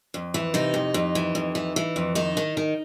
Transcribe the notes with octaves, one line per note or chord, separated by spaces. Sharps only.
F2
E3
C3 D#4
F2
F2
E3
F2
E3
E3
F2
D#3 D#4
D#3
D#3